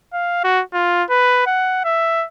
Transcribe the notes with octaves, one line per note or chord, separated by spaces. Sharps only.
F5
F#4
F4
B4
F#5
E5